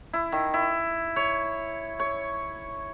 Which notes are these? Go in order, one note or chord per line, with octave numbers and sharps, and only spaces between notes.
E4
D#3
E4
C#5
C#5